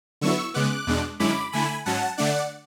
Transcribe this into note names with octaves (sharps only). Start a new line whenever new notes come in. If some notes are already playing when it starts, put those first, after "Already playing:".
D3 F#3 B3 E4 C#6 E6
C#3 G#3 B3 D6 F#6
E2 B2 G#3 D4
F#2 D3 G#3 C#4 E4 B5 D6
D3 A3 E4 G#5 B5
G#2 F#3 C#4 F#5 A5
D3 A3 D4 D5 F#5